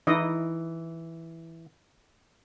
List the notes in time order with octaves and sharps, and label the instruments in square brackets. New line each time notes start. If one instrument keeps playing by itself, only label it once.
[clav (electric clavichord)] E3 [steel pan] D#4 E4 D#5